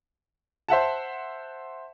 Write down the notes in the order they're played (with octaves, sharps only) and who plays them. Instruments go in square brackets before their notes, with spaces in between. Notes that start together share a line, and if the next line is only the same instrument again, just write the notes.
[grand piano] C5 E5 F#5 A5